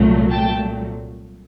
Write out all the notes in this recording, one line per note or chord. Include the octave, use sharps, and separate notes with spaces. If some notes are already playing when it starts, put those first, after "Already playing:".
Already playing: C2 A#2 F#3 A3
G5 A5